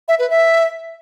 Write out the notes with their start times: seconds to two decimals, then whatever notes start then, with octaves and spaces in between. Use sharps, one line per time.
0.08 E5
0.19 B4
0.30 E5